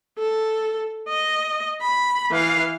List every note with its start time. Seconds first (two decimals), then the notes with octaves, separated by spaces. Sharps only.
0.19 A4
1.09 D#5
1.82 B5
2.31 E3 F5